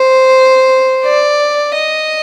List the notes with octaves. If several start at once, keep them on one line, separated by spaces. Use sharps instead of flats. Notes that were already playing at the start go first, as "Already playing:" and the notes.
Already playing: C5
D5
D#5